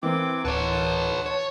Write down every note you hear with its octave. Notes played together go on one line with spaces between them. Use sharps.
E3 A#3 C4 D6
D1 B4 C#5 F#5 A5
C#5